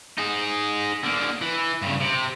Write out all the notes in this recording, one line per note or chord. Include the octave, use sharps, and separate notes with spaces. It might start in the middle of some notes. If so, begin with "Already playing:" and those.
D#4 G#4
D3 A#3
E3
G2 C#3
C3